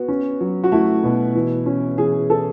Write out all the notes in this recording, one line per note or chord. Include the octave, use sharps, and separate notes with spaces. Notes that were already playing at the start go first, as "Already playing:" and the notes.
Already playing: B3 F#4
C#4
F#3
F#4
A3 E4
B2
E3
C#4
E3 G#4
A4